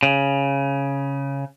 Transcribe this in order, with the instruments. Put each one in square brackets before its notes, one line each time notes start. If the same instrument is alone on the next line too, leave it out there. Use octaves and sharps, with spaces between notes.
[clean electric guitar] C#3